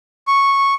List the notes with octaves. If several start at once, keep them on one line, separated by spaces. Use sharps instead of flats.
C#6